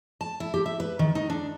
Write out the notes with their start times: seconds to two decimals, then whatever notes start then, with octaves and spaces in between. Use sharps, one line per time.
0.21 A5
0.40 E4
0.54 G4
0.66 E5
0.80 B4
0.99 D#3
1.15 D#4
1.30 D4